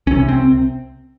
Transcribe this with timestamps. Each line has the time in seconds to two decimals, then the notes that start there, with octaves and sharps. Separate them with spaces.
0.07 C2 C3 C#4
0.28 C4